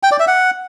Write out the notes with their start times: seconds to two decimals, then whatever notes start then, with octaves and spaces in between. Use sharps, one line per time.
0.03 G5
0.11 D5
0.19 E5
0.28 F#5